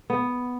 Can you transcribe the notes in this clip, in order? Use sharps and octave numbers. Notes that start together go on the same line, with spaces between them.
B3